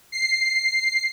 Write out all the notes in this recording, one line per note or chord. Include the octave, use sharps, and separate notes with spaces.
C7